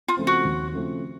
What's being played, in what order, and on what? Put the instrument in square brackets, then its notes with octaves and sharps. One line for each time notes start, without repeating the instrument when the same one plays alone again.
[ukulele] F4
[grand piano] C#3 F3 A3 C4
[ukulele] F#4
[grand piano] D#2
C#3 F3 A3 C4